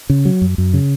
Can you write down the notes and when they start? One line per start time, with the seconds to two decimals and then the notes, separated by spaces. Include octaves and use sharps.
0.10 C#3
0.25 F#3
0.42 F#2
0.58 F#2
0.74 C#3